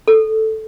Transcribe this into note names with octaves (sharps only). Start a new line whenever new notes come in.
A4